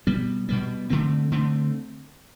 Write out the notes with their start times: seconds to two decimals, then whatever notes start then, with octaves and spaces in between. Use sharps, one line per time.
0.07 B2 G3 B3
0.49 B2 G3 B3
0.90 D3 A3 C4
1.31 D3 A3 C4